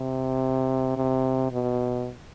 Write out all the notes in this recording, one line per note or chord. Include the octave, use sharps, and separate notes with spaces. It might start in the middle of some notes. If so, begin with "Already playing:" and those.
Already playing: C3
C3
B2